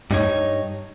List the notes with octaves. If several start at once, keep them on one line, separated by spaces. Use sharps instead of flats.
G2 D#4 C#5